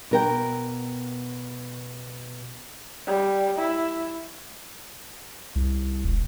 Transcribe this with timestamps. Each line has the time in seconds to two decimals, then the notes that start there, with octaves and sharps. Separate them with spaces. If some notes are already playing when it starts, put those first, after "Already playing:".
0.11 B2 A#4 G5
3.07 G3
3.58 E4
5.55 C2
6.05 E1